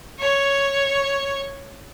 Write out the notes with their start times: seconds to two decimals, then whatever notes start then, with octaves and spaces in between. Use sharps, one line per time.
0.19 C#5 C#6